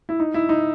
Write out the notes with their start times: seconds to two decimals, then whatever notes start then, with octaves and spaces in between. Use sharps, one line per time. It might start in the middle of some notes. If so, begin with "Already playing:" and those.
0.09 E4
0.20 D#4
0.34 E4
0.49 D#4